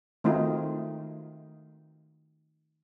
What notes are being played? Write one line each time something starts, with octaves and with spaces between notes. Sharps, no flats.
D#3 A3 C4 D#4 F4 F#4